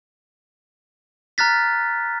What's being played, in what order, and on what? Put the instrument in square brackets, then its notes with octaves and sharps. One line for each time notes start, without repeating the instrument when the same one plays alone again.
[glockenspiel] A#5 F6 F#6 A6 B6